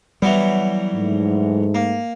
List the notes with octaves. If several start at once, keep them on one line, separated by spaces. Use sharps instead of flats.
E3 F#3 G3 B3
G#2 A3
A#3